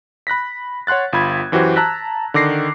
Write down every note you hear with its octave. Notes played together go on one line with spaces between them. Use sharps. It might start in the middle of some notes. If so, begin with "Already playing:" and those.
B5 F#6 A#6 B6
C#5 F#5 C6 F#6 A6
G1 F4 B5 G#6
F#2 E3 F#4 G4 C5
A5 A#5 E6 F#6 A#6 B6
D3 D#3 D6 A#6 C7